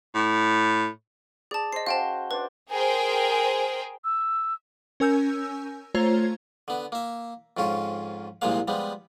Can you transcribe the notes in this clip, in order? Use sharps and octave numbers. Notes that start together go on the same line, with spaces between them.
A2
G#4 D5 A5
C5 D#5 C7
C#4 F#4 C5 F5 G5 A5
D4 B4 C5 D5
G#4 A#4 C5 G5
E6
C#4 A#4 G#5 E6 G6
A3 F4 C5 C#5 A#5 G#6
D3 B3
A#3 E5
F2 G#2 C#4 F4
C2 A#2 F3 G#3 A#3 F5
F3 G3 G#3 B3